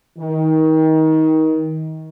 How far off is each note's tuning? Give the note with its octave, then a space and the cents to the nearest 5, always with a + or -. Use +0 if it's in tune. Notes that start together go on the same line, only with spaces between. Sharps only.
D#3 +25